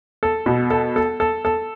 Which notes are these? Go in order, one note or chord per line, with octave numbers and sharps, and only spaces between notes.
A4
B2
A4
A4
A4
A4